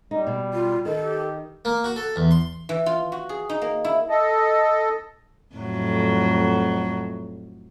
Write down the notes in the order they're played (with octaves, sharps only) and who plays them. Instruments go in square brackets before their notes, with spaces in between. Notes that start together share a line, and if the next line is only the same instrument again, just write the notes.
[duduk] G3 [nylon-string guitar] D#4
[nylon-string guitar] B2
[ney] F4
[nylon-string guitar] D#3 [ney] A4
[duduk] G4
[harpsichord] A#3
F#4
A4
E2
C6
[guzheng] E3
F4
F#4
G#4
D#4
A#3
E4
[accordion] A4 D#5
[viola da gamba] F2 A2 F#3